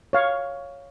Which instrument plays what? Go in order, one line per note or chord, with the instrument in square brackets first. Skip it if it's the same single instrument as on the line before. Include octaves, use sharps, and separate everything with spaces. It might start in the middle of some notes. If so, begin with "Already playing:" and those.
[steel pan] C#5 F5